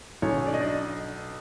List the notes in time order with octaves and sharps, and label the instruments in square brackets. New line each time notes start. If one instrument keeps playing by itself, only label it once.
[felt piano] B1 B2 C#4 C#5
D5
D#5
D4 D5